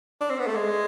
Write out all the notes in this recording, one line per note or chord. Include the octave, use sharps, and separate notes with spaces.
D4
C4
B3
A3
G#3